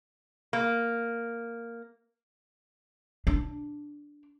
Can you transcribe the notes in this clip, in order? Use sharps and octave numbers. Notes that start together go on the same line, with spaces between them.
A#3
D4